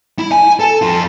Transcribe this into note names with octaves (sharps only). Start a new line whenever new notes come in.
E4
G#5
A4
F2 F4